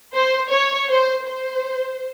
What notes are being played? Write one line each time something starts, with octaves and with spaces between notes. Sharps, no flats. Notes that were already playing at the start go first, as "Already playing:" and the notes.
C5
C#5
C5
C5